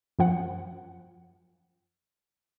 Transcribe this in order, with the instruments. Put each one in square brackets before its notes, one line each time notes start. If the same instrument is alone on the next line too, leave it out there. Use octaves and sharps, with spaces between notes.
[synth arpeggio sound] F#2 F3 F#5